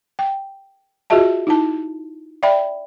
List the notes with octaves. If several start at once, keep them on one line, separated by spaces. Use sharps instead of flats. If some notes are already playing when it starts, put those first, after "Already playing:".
G5
F4 F#4 G#4 D#5 E5 A5
D#4 E4 A5
D5 E5 G5 B5